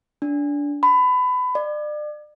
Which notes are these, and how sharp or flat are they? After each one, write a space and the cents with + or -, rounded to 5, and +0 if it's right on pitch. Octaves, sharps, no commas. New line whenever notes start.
D4 -20
B5 +25
D5 +35